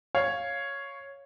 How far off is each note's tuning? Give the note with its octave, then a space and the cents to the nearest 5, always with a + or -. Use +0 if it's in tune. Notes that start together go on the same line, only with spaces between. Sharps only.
C#5 +0 F5 +0